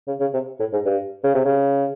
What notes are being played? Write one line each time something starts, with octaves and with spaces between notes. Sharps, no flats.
C#3
C#3
C3
A2
G#2
G2
C#3
C3
C#3